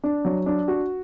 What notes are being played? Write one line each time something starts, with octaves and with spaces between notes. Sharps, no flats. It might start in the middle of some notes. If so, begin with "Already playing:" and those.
D4
F#3
D4
F#4